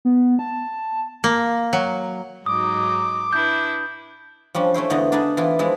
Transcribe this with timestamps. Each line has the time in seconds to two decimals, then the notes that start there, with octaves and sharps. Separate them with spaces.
0.05 B3
0.39 A5
1.24 A#3
1.73 F#3
2.46 G#2 F#3 D#4 D6 D#6
3.33 D4 E4 B4 G6
4.55 F3 G3 C#4 D4
4.74 A3 C#4 E4 C5
4.90 E2 D3 E3 B3 D#5
5.12 D4 D#4 G#4 B4 D5 E5
5.37 E3 B3 E4 F4
5.59 F3 G#3 D4 E4